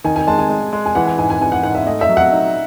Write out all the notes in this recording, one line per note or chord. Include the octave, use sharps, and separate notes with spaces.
D#3 G#5
G#5
G#3 A5
G#5
G#3
G#3
G#5
E3 F#5
G#5
G#2 G#5
G#5
E3 G#5
F#5
G#2 F#5
E5
A3 D#5
E5
F#3
F#5
D#4